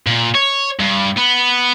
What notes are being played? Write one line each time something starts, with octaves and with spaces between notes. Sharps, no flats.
A#2
C#5
G2
B3